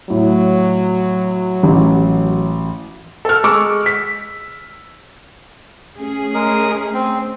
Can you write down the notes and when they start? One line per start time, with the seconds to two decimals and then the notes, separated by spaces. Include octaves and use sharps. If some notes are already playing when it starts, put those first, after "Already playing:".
0.10 A2 F#3
1.63 A1
3.25 A4 F6
3.44 G#3 C#6 D6 E6
3.86 B6
5.95 A3 C#4 G#4
6.34 G#3 A#4 D#6
6.94 C4